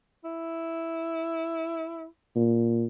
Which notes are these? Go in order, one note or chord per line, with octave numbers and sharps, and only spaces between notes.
E4
A#2